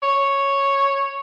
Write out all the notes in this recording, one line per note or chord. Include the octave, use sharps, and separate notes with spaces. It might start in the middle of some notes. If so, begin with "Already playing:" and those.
C#5